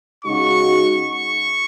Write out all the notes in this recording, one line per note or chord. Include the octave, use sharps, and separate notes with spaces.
C#3 G#3 D#4 F#4 C#6
C#6